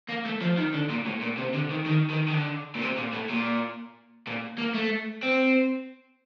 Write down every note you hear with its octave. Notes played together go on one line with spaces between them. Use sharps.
A#3
A3
F3
D#3
D3
A#2
A2
A#2
C3
D3
D#3
D#3
D#3
D#3
D3
A#2
C3
A#2
A2
A#2
A#2
A#3
A3
C4